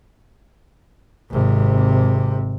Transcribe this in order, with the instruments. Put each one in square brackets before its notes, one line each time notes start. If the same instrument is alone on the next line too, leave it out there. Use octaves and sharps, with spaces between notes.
[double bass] G#1 C3